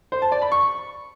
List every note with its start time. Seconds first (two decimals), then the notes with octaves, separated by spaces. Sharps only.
0.12 C5
0.22 A5
0.32 D5
0.42 B5
0.52 C#6